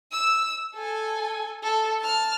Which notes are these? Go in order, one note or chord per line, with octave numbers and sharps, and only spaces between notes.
E6
A4 G#5
A4
A5 F6